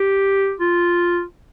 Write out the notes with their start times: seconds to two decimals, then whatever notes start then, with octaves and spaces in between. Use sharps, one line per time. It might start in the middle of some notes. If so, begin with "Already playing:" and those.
Already playing: G4
0.60 F4